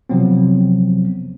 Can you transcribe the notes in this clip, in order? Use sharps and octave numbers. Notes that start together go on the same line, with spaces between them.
C3 F3 F#3 B3 C4